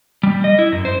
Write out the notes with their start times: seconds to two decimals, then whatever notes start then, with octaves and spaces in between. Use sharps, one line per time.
0.23 G3
0.44 D#5
0.59 E4
0.72 F#2
0.85 C5